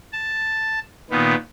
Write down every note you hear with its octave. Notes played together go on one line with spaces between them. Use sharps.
A5
A#2 D#3 B3